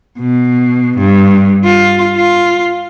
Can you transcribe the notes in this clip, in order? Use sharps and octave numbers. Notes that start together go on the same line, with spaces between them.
B2
G2
F4
F4